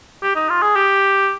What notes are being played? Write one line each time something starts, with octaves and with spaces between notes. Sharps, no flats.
G4
D#4
F4
G#4
G4